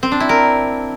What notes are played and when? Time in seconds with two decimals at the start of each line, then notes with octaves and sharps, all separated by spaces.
0.03 C4
0.12 D4
0.20 E4
0.29 A#4